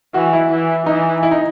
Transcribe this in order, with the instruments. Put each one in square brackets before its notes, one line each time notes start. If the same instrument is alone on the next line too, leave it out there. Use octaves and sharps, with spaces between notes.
[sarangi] E3 [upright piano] F#4
[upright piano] E4
[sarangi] E3
[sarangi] E3 [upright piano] D#4
[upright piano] E4
D#4